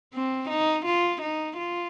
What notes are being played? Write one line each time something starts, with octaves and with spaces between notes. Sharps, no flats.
C4
D#4
F4
D#4
F4